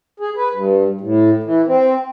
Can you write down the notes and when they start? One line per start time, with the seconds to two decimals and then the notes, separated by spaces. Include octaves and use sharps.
0.20 G#4
0.36 B4
0.53 G2
1.01 A2
1.43 E3
1.67 C4